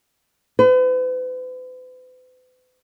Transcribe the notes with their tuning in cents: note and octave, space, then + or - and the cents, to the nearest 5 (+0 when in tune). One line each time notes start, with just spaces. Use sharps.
B4 +45